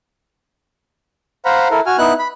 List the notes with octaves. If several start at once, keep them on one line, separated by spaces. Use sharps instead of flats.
C5 F5 F#5 A#5 B5
E4 A4 A#4
F#4 G#5 F6
B3 D#4 E4 F#6
B5